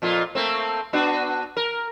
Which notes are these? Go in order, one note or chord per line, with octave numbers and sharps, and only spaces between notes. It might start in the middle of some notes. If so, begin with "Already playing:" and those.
F2 A#2 F4
A3 A#3 C4
B3 D4 F#4
A#4